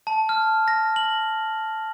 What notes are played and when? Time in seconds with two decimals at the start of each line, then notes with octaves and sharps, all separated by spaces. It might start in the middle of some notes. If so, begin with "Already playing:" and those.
0.07 A5
0.29 F6
0.68 A#6
0.96 F#7